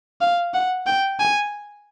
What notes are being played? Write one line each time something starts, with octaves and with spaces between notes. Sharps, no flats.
F5
F#5
G5
G#5